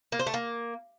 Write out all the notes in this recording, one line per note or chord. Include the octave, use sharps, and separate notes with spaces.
A#3
C5
A3
A#3